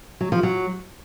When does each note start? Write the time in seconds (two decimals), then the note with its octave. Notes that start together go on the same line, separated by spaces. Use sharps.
0.21 F#3
0.32 F3
0.43 F#3